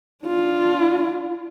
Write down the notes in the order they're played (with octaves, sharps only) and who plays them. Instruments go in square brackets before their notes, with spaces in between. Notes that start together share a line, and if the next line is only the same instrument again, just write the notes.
[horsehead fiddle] D4 F4